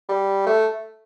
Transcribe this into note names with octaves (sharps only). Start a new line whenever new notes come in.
G3
A3